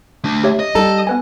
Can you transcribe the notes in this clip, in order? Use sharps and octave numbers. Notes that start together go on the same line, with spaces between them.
A3 D4
G4 C#5 E5
D#5
G3 D#4 A4 A#5
B3 B4 G#5